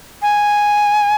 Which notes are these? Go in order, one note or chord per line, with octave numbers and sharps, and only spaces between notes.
G#5